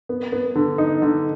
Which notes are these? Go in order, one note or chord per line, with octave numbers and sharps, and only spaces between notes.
B3
B3
D3
D#4
D3